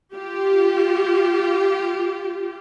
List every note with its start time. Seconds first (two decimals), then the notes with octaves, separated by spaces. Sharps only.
0.16 F4 G4